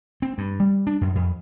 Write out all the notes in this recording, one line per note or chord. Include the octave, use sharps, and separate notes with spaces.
C4
G2
G3
D4
F#2
F2